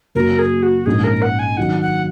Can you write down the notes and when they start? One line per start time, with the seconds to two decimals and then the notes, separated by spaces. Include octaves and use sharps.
0.15 F#1 F#2 F#3 A#3 F#4 A#4
0.39 G#4
0.63 F#4
0.86 A#1 G#2 G#3 C#4 G#4
1.04 A#4
1.22 F#5
1.39 G#5
1.57 D#3 F#3 D#4 F#5
1.81 F#5